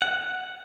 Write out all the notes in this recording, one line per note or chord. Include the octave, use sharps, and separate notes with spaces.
F#5